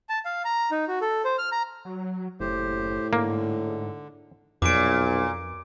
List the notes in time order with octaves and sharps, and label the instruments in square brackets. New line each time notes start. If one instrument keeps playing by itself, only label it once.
[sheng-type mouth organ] A5
F5
A#5
D#4
F#4
A4
C5
F6
A#5
[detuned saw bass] F#3
[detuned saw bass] F#1 [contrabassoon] A2 [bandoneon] G4 C5
[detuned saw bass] G#2 [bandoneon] D3 [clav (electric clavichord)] A#3
[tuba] B1 [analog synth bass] F2 [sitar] A#2 [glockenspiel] D6 D7